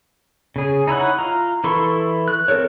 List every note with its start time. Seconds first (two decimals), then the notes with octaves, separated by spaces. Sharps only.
0.56 C#3 G#4
0.88 D#4 E4 C#5 F#5
1.19 F4 A#5
1.64 E3 E4 A4 C6 C#6
2.28 F#6
2.48 C4 F#4 A4 A#4 C#5